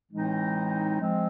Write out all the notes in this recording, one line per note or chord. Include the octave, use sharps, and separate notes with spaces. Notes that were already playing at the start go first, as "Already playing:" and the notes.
A2 E3 G#3 C4 D#4
F3 G#3 C4